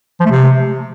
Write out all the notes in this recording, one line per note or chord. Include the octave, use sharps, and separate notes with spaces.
F3
A3
C3